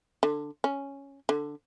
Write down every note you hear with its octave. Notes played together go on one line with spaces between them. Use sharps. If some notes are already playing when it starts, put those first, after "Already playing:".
D3
C#4
D3